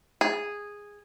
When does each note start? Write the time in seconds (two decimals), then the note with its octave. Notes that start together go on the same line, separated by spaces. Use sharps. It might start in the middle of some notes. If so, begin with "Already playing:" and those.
0.21 G#4